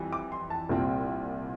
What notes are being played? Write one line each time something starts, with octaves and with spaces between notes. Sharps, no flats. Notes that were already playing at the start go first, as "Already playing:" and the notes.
Already playing: F2 E3 G3
D6
C6
A5
C2 A#2 G3 C4